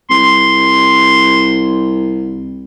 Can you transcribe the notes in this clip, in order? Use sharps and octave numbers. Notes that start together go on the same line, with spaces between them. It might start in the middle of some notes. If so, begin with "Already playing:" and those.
C2 C6